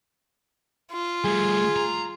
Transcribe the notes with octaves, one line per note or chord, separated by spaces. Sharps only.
F4
G3 A3 G#4
A#5